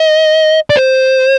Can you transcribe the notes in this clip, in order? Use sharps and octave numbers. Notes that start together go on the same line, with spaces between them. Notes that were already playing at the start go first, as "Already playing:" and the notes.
Already playing: D#5
D5
C5